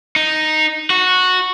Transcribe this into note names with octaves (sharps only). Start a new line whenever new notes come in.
D#4
F#4